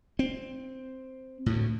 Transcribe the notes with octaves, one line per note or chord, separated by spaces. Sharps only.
C4
D2 A2